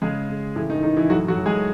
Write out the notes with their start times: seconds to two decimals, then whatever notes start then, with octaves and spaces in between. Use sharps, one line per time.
0.02 C#3 G#3 G#4
0.29 C#3
0.56 A2 E3 E4
0.70 D#3 D#4
0.83 D#3 E3 D#4
0.97 E3 E4
1.10 A2 F#3 F#4
1.28 F#3 F#4
1.37 A2
1.46 G#3 G#4